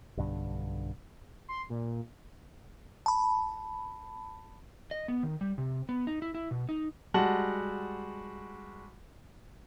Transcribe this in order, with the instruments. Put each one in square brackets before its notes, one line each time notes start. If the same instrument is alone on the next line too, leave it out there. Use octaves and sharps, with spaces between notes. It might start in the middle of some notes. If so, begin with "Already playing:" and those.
[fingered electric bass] B1 G2 D3
[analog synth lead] C6
A#2
[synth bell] A5 B5
[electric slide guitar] D#5
B3
D#3
G3
C3
B3
D#4
E4
E4
B2
D#4
[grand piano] G3 G#3 F#4 F#5 A5 F#7